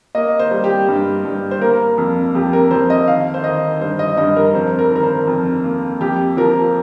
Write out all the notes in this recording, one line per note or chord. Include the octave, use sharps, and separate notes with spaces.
A#3 D#5
C5
G3
G4
G2
G2
C5
A#3 A#4
F2
F2 G4
A#4
F2 C5
D#5
D#3 F5
C5
D#3 D#5
G2 C5
D#5
G2 D#5
A#4
F2 C5
A#4
D#3 A#4
C5
F2
A#3
F2 G4
F3 A#4